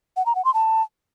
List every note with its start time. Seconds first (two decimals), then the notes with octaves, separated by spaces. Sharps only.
0.17 F#5
0.26 A#5
0.35 F#5
0.45 C6
0.54 A5